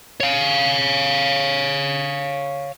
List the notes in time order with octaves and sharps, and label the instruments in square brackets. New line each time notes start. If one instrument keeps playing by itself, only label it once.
[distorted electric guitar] C#5 F5